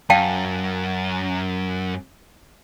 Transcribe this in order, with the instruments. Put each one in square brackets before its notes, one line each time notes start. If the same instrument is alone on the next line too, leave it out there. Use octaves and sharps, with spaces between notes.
[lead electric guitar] F#2 [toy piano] F5 G5 A5